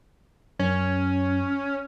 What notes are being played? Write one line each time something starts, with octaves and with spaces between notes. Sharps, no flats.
F#2 C#4